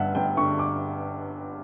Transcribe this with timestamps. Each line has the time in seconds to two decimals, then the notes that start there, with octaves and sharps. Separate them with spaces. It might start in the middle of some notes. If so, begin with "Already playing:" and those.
Already playing: G1 G2 E5 F#5
0.15 G1 G5
0.37 D3 C#6
0.59 D6